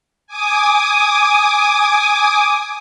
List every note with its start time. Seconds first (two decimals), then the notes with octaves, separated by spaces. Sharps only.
0.27 G#5 D6 D#6